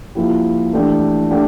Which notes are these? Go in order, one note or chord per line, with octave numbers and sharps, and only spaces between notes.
F3 A#3 E4 G4
E3 A3 D4 G4
A3 D4 G4